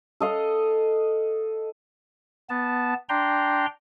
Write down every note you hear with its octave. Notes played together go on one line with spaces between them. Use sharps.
A4 D#5 F5
B3 A5
D4 G5 A#5 C6